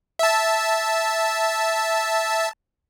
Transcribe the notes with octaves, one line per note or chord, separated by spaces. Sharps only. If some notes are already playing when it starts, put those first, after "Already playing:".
E5 A5